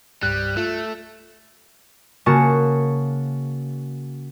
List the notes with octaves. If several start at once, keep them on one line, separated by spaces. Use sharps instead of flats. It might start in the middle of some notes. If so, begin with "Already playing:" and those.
C2 G2 G3 F#6
A3 F4
C#3 A#3 F#4 A5 C#6